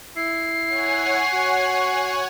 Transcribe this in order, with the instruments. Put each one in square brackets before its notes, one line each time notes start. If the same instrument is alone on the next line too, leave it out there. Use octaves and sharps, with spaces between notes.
[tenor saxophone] E4 [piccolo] C7
[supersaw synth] C#5 F#5 G#5
[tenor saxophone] F#4